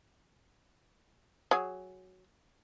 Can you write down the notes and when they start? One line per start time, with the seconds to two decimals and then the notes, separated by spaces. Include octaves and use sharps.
1.51 F#3 G#4